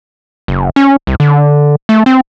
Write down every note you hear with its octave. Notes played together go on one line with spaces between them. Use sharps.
F#1
C#4
C2
D3
A3
C4